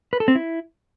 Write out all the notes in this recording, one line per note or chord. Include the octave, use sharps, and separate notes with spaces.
B4
A4
C4
E4